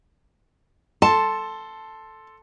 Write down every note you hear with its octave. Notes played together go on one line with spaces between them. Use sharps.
A4 A5 C6